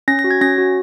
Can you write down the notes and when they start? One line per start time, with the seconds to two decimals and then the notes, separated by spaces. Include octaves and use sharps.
0.08 C#4 A#6
0.19 A#6
0.24 F#4
0.31 G#6
0.41 C#4 A#6
0.58 F#4